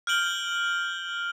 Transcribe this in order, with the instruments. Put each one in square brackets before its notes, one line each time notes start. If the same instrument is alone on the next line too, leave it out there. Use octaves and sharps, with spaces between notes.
[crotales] F6 G6 D7 F#7 G7